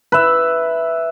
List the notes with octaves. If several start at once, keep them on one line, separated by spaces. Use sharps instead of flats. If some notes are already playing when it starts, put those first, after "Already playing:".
B4 E5